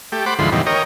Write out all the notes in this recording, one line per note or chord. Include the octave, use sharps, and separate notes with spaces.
A3 G4
C5 F#5 B5 D6
D2 G#2 E3 F3 B5 C6
F#2 B2 D#3 E3 G3
A#4 C#5 D#5 G5